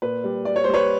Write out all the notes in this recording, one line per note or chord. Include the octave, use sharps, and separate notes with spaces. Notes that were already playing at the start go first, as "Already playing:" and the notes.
A#2 B4
G3
G3 D5
C#5
G3 C5
B4 C#5